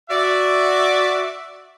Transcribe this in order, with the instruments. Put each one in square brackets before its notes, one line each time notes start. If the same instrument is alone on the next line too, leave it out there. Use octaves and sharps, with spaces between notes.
[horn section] F#4 D5 E5